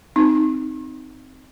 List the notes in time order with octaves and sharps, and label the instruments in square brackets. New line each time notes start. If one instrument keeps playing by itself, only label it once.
[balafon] C4 D#4